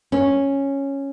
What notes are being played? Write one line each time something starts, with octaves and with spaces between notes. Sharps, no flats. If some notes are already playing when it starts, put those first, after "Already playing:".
C#4